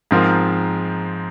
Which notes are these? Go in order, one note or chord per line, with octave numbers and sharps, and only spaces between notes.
G#2 F3 C4 F4 A#4